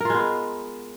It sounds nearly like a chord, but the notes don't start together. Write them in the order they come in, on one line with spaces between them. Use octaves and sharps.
A#4 F4 G#3 B3